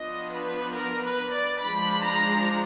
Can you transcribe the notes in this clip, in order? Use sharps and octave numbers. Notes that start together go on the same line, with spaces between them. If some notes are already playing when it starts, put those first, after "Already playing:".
Already playing: F3 B3 D4 D#5
B4
A#4
B4
D5
F3 G#3 D4 B5
A#5